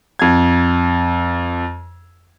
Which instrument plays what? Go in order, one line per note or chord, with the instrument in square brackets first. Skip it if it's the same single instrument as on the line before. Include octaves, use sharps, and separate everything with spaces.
[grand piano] F2 G#6